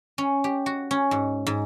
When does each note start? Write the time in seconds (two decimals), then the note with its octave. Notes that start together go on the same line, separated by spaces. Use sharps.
0.18 C#4
0.44 G4
0.66 F#4
0.91 C#4
1.11 G#2
1.46 G#2